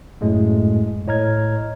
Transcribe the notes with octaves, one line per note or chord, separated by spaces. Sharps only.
F#2 A2 G#3 A3
A2 C#5 D#5 A#5 F6 G#6